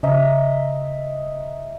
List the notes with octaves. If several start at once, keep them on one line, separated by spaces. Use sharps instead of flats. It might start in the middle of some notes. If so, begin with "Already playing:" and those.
C#3 D#5 E5 A#5